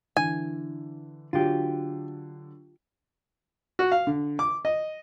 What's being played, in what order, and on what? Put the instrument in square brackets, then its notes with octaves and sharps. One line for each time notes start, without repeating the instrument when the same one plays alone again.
[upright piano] D3 E3 [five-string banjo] G#5
[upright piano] D3 F#3 [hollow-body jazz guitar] F4 G4
[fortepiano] F#4
F5
D3
D6
D#5